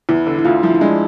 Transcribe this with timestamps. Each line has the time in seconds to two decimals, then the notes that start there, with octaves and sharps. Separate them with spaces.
0.09 E2 E4
0.27 D3
0.39 E4
0.45 D2 F4
0.63 F3 E4
0.74 E4
0.81 G#3 D4